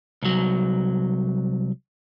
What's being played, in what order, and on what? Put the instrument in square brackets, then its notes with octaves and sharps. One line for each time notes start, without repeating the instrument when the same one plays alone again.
[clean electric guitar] C2 F#3